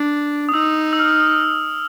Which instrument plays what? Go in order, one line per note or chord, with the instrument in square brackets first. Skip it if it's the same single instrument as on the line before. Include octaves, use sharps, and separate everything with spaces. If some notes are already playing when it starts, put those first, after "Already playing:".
Already playing: [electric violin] D4
[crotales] D#6
[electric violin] D#4 [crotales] E6
[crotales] E6
F6
F6